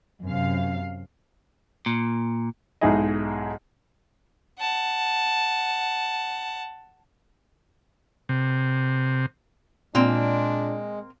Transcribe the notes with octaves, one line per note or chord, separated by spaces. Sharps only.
F#2 C3 F5
A#2
B1 G#2 D#4 E4 G#4 D#5
F#5 A5
C3
A#2 G#3 A#3 C4 D4